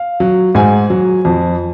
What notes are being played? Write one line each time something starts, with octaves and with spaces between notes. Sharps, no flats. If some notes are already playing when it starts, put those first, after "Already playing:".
Already playing: F5
F#3
G#2 G#5
F#3
F2